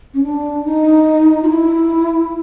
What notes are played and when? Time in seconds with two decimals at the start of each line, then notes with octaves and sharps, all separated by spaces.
0.14 C#4
0.23 D4
0.65 D#4
1.43 F4
1.49 E4